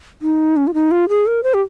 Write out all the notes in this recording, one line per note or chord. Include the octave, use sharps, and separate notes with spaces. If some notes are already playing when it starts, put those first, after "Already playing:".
D#4
C#4
F4
D#4
F4
G#4
A#4
C5
G4